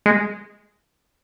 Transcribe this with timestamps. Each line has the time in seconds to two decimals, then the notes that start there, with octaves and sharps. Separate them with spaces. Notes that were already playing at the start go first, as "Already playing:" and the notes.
0.06 G#3